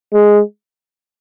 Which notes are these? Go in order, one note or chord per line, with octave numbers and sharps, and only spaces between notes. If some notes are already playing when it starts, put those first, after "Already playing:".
G#3